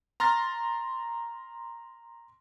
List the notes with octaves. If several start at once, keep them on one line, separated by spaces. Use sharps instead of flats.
A#5 C6 F6 A6 A#6